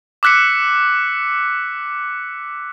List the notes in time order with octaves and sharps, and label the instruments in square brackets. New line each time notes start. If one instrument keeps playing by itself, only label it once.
[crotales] D6 E6 F#6 B6 C#7